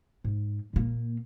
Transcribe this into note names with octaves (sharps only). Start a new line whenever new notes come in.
G#2
A#2 A#3